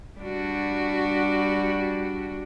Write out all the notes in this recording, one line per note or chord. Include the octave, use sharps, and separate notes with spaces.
G3 D4 F#4